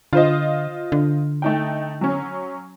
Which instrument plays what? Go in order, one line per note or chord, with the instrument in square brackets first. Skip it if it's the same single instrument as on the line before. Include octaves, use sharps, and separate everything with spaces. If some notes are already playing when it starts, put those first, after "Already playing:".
[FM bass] D3 [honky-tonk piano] F4 C5 D#5
[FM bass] D3
[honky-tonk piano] A3 D#4 G5
F#3 C#4